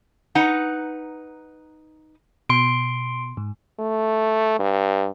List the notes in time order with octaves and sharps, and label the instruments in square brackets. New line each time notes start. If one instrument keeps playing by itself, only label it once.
[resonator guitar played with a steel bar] D#4 B4 F#5 A#5
[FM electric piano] B2 [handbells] C6 D7
[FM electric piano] G#2
[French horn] A3
G2